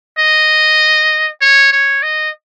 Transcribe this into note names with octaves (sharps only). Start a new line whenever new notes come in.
D#5
C#5
C#5
D#5